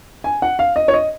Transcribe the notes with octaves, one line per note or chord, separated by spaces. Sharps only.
G#5
F#5
F5
D#5
C#5
D#5